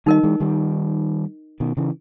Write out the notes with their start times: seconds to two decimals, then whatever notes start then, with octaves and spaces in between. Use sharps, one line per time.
0.06 D#3 G3 D#4 A#4 D#5
0.23 E3 G#3
0.40 D#3 G3
1.60 B2 D#3
1.77 C#3 E3